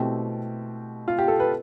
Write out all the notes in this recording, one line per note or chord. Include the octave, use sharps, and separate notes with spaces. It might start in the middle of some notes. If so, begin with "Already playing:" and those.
Already playing: B2 A3 C4 E4 G4
F4
G4
A4
B4